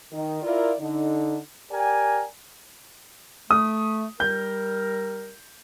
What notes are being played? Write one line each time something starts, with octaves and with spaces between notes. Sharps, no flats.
D#3
E4 F4 A#4 D5
D3 D#4
G4 A#4 D5 G5 G#5
A3 D#6
G3 A#4 G6